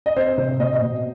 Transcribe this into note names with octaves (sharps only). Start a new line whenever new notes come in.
D#5
C4 C5
C5
C3 C5
C5
B2 D#5
D#5
B2